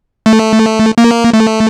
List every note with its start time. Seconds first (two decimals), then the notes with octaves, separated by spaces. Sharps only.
0.26 A3
0.98 A#3
1.33 A3